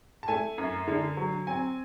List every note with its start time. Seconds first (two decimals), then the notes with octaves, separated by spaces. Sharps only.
0.23 A5
0.28 A3 G#5
0.58 F#2
0.88 D3
1.17 F#3
1.47 C4 G#5